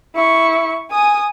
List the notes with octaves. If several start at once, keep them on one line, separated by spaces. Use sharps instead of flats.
E4 C#6
G#5 D#6